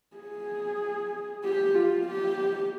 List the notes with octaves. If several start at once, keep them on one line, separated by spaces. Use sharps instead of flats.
G#4
G4
F4
G4